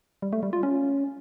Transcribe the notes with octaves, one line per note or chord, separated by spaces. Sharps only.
G3
A3
G3
F4
C#4